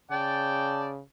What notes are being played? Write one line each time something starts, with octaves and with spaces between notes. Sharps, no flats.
C#3 D5 G5 A5